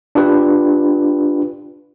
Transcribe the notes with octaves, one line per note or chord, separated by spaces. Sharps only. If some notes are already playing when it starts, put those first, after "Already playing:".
D4 F4 G4 B4